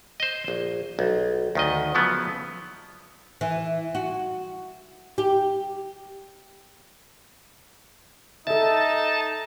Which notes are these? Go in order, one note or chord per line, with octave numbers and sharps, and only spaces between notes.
C5 D#5
A#1
B1
D2 D#3 D#5
C#3 F3 F#3 B3
E3
F#4
G4
D#4 A4 E5 A5